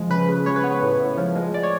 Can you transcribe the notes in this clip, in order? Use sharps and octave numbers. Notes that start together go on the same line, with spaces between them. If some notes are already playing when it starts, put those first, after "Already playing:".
Already playing: F3 G#3
C#3 B4
C#3
G#3 C#5
B4
B3 C#5
A2
A2
F3
G#3
D5
C#5